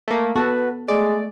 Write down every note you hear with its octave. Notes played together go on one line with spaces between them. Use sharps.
A3 A#3
B3 F#4 A4 B4 A5
G#3 A3 D5